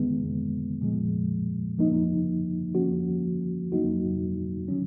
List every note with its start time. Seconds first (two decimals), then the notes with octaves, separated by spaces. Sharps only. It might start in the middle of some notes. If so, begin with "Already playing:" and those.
Already playing: D#3 G#3 B3
0.81 A#2 F3 G#3
1.78 F3 A#3 D#4
2.75 F3 A#3 C#4 F#4
3.72 F#3 A#3 D#4 F#4
4.68 D#3 F#3 C#4